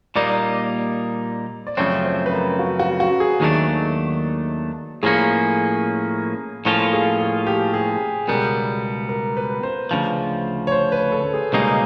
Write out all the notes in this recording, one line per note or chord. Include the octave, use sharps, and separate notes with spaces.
A#2 G3 A#3 D#4 D5
D5
F#2 C#3 F3 A3 C4 C#5
C5
B4
A#4
F#4
F#4
F#4
G#4
D#2 D#3 F#3 A3 D4
A2 F3 A#3 C#4 G#4
A2 F3 A#3 C#4 F4 A4
G#4
G#4
G4
G#4
C#2 B2 G3 B3 A#4
A#4
B4
C5
D2 C#3 F3
C#5
C5
B4
A4
G#4
C#2 B2 G3 A#3 D#4 G#4